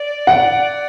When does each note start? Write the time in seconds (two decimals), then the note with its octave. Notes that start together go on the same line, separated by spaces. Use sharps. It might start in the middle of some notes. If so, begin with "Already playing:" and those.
Already playing: D5
0.27 F#5